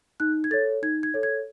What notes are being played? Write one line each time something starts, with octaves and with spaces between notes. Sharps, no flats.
D#4 F#6
G#6
A4 C#5 A6
D#4 G#6
G#6
A4 C#5
G#6